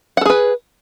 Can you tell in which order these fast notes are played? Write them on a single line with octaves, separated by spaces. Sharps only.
F#5 A4 G#4 B4